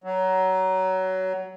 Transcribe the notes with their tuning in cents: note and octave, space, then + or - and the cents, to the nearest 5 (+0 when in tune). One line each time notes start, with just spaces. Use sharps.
F#3 +20